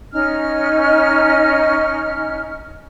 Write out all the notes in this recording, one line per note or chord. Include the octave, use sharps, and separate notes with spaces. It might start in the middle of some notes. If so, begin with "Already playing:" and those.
C#4 D#4 F6